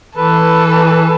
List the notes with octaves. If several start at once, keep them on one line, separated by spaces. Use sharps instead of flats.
E3 A4 B4